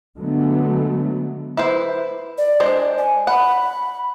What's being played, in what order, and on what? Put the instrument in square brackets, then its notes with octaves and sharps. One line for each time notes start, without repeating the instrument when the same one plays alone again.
[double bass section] D3 F#3 G#3 A3 B3
[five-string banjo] E4 B4 C5
[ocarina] D5
[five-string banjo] G#3 D4 C5
[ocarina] G#5
[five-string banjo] F#5 [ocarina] B5